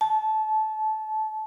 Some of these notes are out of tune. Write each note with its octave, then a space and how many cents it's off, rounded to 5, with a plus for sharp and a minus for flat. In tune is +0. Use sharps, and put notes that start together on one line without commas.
A5 -25